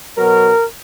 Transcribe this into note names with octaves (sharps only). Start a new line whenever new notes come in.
B2 F#3 B3 A#4